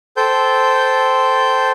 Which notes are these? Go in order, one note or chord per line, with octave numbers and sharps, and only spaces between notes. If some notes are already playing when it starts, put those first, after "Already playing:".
A4 C5 G5 G6